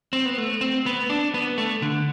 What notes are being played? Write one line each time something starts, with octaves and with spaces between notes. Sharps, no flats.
C4
B3
A3
C4
B3
D4
B3
A3
D3